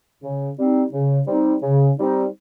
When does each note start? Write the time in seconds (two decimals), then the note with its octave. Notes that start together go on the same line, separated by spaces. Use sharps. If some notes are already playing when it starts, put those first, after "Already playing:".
0.22 C#3
0.57 G3 C4 D#4
0.92 C#3
1.28 G3 C4 D#4
1.63 C#3
1.98 G3 C4 D#4